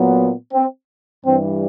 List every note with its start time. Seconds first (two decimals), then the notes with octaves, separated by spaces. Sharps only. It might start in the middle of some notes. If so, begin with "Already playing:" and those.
Already playing: A#2 F#3 B3
0.53 C4
1.25 G2 E3 G3 C4